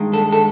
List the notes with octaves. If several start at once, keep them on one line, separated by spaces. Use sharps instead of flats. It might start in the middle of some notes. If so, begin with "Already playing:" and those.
Already playing: G2 D#3 G#3
A4
A4